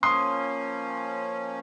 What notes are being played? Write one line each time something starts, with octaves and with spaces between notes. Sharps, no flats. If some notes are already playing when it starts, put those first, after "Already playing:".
F3 A#3 C#4 C6 D#6